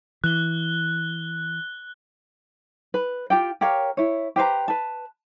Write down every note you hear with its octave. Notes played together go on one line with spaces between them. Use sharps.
E3 F#6 G7
B4
F4 G4 G5
G4 A#4 C#5 F5
E4 C#5
G4 B4 C5 A#5
B4 A5